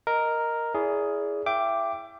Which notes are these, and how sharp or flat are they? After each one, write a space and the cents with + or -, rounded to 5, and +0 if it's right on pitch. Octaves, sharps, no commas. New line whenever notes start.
A#4 +0 D#5 +0
E4 +0 G#4 +5 D5 -35
E5 +35 G5 +0 D6 +0